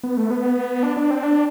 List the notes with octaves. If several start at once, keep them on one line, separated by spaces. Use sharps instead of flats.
B3
A3
B3
D4
D4
C4
D4